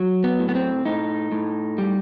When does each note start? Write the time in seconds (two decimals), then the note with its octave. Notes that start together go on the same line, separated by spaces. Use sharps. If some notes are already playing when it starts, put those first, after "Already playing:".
Already playing: F#3
0.24 B3
0.40 A2
0.49 B3
0.55 C4
0.85 A2 D#4
1.32 A2
1.78 G3